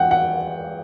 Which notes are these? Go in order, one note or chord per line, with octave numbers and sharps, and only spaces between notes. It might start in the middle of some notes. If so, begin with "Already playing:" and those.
Already playing: E2 F#5 G5
F#5